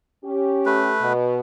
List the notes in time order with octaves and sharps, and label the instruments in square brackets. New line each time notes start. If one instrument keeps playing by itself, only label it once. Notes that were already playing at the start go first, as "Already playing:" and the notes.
[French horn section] C#4 G4
[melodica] A3 B4
[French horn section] B2